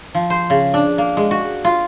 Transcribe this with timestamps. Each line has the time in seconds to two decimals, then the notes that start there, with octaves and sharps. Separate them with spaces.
0.15 F3
0.30 C5
0.50 C#3
0.74 D4
0.98 A#3
1.17 G#3
1.31 F#4
1.65 F4